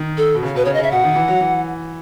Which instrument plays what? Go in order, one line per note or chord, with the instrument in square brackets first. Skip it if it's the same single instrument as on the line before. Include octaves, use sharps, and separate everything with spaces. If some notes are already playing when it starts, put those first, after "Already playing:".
Already playing: [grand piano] D#3
[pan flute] A4
[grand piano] B2
C#3
[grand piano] B2 [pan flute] B4
[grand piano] C#3 [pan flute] C#5
[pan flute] D#5
[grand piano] C#3
[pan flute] E5
[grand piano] B2 [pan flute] F#5
[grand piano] D#3
E3
F#3
E3